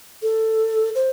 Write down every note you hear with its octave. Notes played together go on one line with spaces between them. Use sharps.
A4
C5